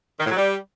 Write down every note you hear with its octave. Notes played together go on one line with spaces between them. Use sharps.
D#3
A2
F#3
G3